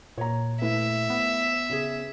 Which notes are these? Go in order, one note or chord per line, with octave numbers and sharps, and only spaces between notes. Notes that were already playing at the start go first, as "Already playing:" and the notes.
A#2 C#5 A#5
A3 E4 B4 E5
B3
C#3 G#4